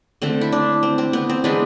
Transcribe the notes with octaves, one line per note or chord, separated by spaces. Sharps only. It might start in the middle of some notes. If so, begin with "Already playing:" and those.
D3 A3 C4
E4
D4
C4
C4
B3
C4
E3 G#3 B3 D4